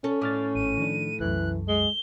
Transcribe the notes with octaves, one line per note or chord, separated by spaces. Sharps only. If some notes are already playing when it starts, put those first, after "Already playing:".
C#4 A4
A2 D6 F6 A6
G#1 D#7
D#3 F3 D4
C2 F#2 E3 F#6
G#3 G7